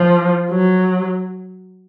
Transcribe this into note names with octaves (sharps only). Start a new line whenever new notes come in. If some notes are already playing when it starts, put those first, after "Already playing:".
Already playing: F3
F#3